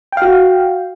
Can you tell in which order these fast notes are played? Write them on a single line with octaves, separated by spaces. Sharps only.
G5 F5 F#4